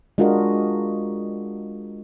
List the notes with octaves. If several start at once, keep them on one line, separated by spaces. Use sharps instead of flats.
G#3 D4 F4 F#4 A#4 D#5